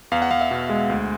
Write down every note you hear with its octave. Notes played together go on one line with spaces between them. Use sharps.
E2 F5
F#5
E2 F5
E5
B2
G#3
D2